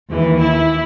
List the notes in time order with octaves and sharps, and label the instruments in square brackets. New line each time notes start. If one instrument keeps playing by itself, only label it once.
[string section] D#2 E3
E4